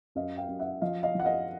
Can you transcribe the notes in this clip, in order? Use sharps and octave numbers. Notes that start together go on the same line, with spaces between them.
F#2 D#5 F5
F5 G5
F#2
E5 F#5
F3 D#5 F5
D#5 F5
F3 F#5
D#5 F5